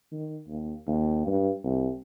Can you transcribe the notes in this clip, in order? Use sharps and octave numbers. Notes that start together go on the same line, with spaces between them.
D#3
D#2
D#2
G2
C2